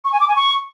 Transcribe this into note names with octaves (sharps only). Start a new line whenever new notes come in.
C#6
G#5
D6
G#5
C#6